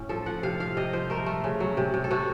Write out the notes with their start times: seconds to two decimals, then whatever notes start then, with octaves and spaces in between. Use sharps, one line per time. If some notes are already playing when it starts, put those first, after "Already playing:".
Already playing: A2 C#4
0.09 F3 A4
0.26 F3 F#5
0.43 C3 F5
0.60 F3 F5
0.77 C3 D#5
0.93 F3 C5
1.10 A3 A#4
1.26 A3
1.44 C#3
1.60 F#3
1.77 C3
1.94 C3
2.04 A4
2.11 C3 F#4